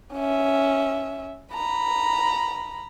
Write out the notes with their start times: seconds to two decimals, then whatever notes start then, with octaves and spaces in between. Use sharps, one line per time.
0.14 C#4 E5
1.53 A#5 B5